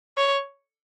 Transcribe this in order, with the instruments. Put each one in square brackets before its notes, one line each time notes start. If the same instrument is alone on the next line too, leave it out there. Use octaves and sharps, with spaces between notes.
[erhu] C#5